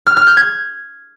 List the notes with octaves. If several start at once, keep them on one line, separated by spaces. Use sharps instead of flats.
F6
F6
G6
G#6